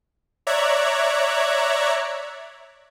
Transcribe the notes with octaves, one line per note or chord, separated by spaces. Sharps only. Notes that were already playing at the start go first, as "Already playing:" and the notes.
C#5 D5 E5 A#5 F#6 G#6